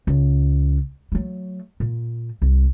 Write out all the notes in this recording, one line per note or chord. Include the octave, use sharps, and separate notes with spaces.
C#2
F#3 A3
A#2
C2